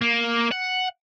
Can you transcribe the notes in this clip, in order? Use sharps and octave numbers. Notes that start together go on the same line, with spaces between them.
A#3
F#5